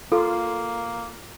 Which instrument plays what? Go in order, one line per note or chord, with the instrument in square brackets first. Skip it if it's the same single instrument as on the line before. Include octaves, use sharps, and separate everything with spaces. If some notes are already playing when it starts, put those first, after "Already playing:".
[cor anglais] A#3 [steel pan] F4 [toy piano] A4